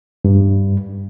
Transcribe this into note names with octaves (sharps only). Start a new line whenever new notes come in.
G2